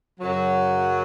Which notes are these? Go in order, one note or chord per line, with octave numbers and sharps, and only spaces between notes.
F#2 C#3 F#3